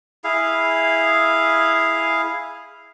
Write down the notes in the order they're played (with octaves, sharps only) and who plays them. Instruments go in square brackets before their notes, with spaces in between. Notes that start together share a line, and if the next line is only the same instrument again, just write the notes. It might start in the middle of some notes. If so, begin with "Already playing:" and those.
[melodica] E4 G#4 F5